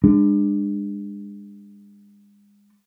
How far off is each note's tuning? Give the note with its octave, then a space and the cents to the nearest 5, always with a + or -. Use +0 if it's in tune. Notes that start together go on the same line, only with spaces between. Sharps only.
G#3 -30 D4 +25